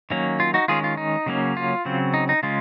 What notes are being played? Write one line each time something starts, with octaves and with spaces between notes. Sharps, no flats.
D#3 F#3 A#3 C#4
F4
D#4 F#4
D#3 G#3 C#4 F4 G#4
F4
D#4
C#3 F#3 A#3 C#4
F4
C#3 F#3 C4
D#4
D#4
C#3 G#3 C#4 F4